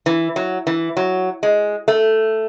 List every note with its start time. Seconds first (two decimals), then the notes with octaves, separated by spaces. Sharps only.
0.06 E3
0.36 F#3
0.67 E3
0.97 F#3
1.43 G#3
1.88 A3